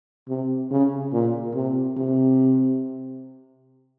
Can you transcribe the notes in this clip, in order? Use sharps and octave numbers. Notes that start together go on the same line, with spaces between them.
C3
C#3
A#2
C3
C3